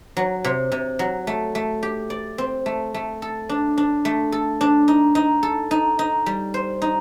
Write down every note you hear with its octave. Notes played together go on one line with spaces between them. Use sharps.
F#3
C3
C3
F#3
A3
A3
G4
D5
C4
A3
A3
A4
D4
D4
A3
A4
D4
D#4
D#4
A4
D#4
D#4
G3
C5
D#4